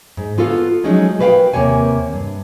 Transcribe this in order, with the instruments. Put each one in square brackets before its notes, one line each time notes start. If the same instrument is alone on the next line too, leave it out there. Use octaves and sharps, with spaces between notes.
[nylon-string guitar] G#2
B3 F4 F#4 A4 F5
F3 F#3 G#3 A3 C#4 D#4
F#4 A#4 B4 D5 F5 G5
D#2 C3 A#3 C#5 G#5
G2